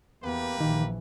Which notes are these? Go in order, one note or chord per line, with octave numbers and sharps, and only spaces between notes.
E2 A#3 B3 G4 B4
A#1 D#3 E3